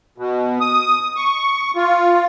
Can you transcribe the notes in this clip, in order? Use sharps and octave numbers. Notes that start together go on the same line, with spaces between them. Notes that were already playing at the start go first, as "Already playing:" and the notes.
B2
D#6
C#6
F4